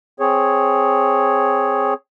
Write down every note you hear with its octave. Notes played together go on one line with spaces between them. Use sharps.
C4 G#4 C#5